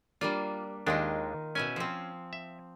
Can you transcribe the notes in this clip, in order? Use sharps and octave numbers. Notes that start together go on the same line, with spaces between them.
G3 A#3 D4 F4
D#2 D#3 G#3 D4 D#4 F4
B2 C#4 E4 G#5
F3 C4
E5